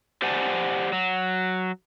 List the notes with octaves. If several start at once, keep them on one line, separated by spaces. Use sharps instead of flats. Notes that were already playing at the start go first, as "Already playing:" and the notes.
G4 C5 D5 F#5 G#5 A5
F#3